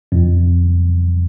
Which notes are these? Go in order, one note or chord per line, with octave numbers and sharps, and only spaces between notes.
F2